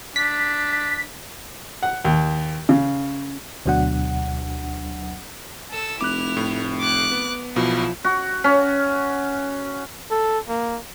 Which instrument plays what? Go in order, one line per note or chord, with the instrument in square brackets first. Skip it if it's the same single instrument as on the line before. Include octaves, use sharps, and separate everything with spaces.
[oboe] D4 [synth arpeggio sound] B6
[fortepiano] F#5
D#2
C#3
[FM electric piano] D2 B2 F#3 D4 F#5
[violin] A4 E6
[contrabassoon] F1 [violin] E4 F7 [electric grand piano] D6 F#6
[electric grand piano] A2
[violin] D6 F#6
[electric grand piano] B3
[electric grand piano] B1 B2 [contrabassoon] F3 [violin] E4
[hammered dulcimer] F#4
C#4
[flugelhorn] A4
A#3